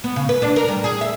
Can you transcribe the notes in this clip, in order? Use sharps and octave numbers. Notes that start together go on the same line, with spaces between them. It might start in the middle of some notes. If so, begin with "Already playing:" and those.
B3
C#3
B4
D4
A#4
G3
G#4
E5